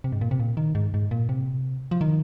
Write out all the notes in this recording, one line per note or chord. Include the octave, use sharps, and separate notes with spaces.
C3
G#2
A#2
C3
A#2
D#3
G#2
G#2
A#2
C3
F3
D#3